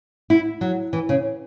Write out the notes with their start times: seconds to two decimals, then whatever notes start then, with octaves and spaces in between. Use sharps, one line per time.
0.30 E4
0.61 F#3
0.93 E3
1.09 C#3